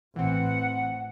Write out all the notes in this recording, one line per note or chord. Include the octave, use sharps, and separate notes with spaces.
A1 E3 C4 F#5